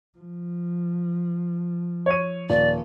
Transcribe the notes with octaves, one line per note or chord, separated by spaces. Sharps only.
F3
C#5 D#7
D#1 D5